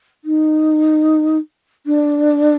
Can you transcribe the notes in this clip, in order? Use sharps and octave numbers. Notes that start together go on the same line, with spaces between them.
D#4
D4